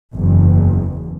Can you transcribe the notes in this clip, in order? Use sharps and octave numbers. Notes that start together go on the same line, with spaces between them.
F#1 E2